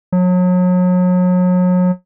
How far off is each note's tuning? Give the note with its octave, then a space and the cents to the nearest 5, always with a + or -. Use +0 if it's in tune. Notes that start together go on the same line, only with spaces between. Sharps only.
F#3 -35